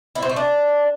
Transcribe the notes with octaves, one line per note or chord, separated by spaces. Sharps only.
E4
C4
A3
D4